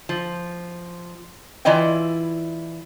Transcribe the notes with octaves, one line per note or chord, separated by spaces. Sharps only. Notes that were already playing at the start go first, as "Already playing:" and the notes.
F3
E3 E4 F4 D5 D#5 G5